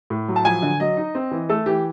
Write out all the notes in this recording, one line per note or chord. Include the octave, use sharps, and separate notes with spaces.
A2
F#3
A5
F3 G#5
D3
F#3 D#5
D#4
C4
E3
A3 A4
E3 G4